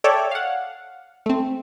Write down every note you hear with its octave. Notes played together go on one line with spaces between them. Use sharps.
A4 C#5 D5 E5 G5
F5 F#5
A3 C4